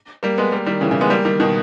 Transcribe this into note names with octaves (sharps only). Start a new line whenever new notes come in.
G3 A#3
G#3 B3
G3 A#3
D#3 G3
C#3 E3
C#3 E3
G#3 B3
G3 A#3
D#3 G3
B2 D#3